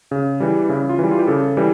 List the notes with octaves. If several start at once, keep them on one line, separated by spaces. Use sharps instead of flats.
C#3
E3 G3
C#3 E4
F4
E3 G3
F4
G4
C#3 A4
E3 G3